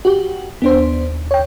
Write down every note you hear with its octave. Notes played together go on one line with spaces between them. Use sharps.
F#4 G4
D#2 B3 D4 C5
C#5 G5